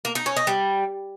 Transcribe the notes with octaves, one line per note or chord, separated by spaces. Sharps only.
A#3
D#4
C#4
D#4
G3